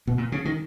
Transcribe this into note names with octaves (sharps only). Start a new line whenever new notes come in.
B2
A#2
C#3
D#3